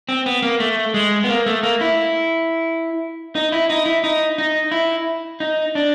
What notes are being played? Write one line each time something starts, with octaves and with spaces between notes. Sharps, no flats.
C4
B3
A#3
A3
G#3
B3
A#3
A3
A#3
E4
D#4
E4
D#4
E4
D#4
D#4
E4
D#4
D4